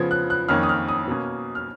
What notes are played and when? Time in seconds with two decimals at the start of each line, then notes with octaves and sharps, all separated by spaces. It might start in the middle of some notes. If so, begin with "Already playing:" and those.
Already playing: C#3 F3 B3 G#6
0.11 F#6
0.30 F#6
0.48 F2 D#3 A#3 C#4 F6
0.63 D#6
0.69 F6
0.89 D#6
1.08 B2 A#3 C#4
1.55 F6